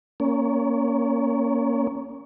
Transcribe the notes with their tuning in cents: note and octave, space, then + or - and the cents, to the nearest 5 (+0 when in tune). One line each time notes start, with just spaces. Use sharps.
A#3 +0 C#4 +0 D5 -45